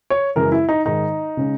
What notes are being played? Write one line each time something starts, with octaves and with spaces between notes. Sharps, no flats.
C#5
F#2 C#3 E3 G#3 A#4
E4
D#4
G#2 D#3 G#3 D#4
C#3 G#3 C#4